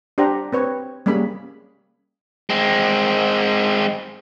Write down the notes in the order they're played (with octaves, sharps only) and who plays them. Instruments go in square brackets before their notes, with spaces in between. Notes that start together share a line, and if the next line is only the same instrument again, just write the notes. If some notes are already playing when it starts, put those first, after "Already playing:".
[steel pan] D4 G4 C5 F#5 A#5
C4 B4 C#5
G3 A#3 C#4 G#4 B5
[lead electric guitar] G#3 C4